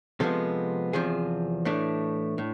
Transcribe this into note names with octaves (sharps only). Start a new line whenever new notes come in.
C3 F3 G#3 B3 A4
E2 C3 F3 G#4
A2 E3 A3 D4
A2